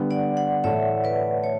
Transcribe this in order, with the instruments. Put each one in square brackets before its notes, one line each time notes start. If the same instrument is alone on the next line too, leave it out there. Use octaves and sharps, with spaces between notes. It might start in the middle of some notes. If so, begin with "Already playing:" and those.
Already playing: [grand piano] D3 G3 B3
[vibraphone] D5 F#5
D5 F#5
[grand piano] A2 E3 A3 [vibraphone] C#5 E5
[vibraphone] B4 D5
C#5